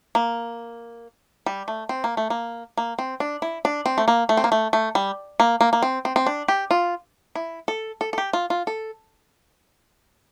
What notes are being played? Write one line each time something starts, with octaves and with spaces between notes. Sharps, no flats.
A#3
G3
A3
C4
A#3
A3
A#3
A#3
C4
D4
E4
D4
C4
A3
A#3
A3
C4
A#3
A3
A3
G3
A#3
A#3
A#3
C4
C4
C4
D4
G4
F4
E4
A4
A4
A4
G4
F4
F4
A4